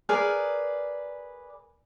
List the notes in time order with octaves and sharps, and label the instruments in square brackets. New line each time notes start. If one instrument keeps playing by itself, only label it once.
[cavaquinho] G#4 A#4 B4 D5